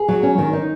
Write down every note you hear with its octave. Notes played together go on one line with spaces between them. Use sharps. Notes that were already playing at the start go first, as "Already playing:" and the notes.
Already playing: G#4
F#3
C#4
D#3
D#4